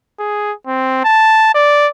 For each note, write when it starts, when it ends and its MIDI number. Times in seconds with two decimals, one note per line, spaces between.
0.19 0.52 68
0.67 1.03 60
1.05 1.53 81
1.54 1.87 74